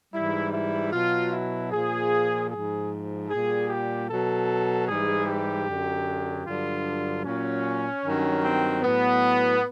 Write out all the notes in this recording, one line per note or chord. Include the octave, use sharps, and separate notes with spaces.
G#2 E3 G3 E4
E4
B2 F#3 F4
E4
A#2 F3 G#4
G#2 F3 G#4
A#2 G3 G#4
G4
B2 F#3 A4
G#2 E3 G3 G#4
G4
F#2 D3 F#3
G2 D3 F#3 F4
A#2 F#3 C#4
G2 D#3 F#3
C4
A2 F#3 B3